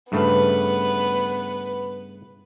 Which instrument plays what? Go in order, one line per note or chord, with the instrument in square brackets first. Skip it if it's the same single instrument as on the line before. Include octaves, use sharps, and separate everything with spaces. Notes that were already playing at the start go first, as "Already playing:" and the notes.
[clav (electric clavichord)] G2 C#3 A3 [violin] B3 B4